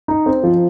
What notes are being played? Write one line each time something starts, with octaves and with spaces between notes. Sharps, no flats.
D#4
C4
F3